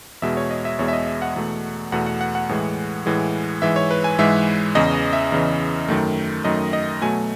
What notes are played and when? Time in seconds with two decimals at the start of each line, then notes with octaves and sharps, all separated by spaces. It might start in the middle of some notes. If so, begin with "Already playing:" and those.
0.22 E2 B2 G#3 E5
0.37 C#5
0.51 D#5
0.65 E5
0.79 E2 B2 G#3 C#5
0.88 E5
0.93 D#5
1.07 E5
1.22 F#5
1.36 E2 B2 A3
1.92 E2 B2 A3 F#5
2.06 F#5
2.21 F#5
2.35 F#5
2.49 A2 E3 G#3
3.06 A2 E3 G#3
3.62 G#2 E3 G#3 E5
3.76 C#5
3.91 B4
4.04 G#5
4.19 G#2 E3 G#3 E5
4.75 E2 C#3 E3 D#5
5.13 E5
5.32 E2 C#3 E3
5.88 F#2 D#3 A3
6.45 F#2 D#3 A3 D#5
6.73 D#5
7.01 B2 F#3 A3 G#5